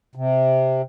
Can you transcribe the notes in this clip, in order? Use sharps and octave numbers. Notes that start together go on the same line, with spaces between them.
C3